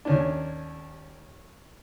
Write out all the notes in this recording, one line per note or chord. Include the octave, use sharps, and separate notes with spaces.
D#2 C#4 D4